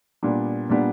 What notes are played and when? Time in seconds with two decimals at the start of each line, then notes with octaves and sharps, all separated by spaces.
0.23 A#2 G3 B3 D4
0.69 A#2 G3 B3 D4